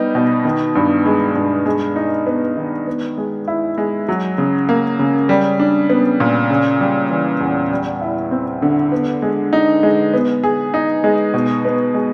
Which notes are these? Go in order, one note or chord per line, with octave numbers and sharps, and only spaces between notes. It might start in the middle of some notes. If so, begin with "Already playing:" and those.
Already playing: G3 B3 D#4
B2
D#3
G2
G#3
G2
G#3
D#4
B3
D#3
B3
G#3
E4
G#3
F#3
C#3
A#3
C#3
G3
D4
B3
A#2
C#3
G3
E3
E2
G3
E4
C4
D3
B3
G#3
D#4
G#3
B3
G#4
D#4
G#3
B2
B3
G#3